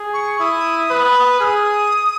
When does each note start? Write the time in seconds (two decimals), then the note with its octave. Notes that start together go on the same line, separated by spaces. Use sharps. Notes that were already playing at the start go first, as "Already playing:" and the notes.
Already playing: G#4
0.13 C#6
0.39 E4 D#6
0.90 B4
1.40 G#4 F6
1.44 D#6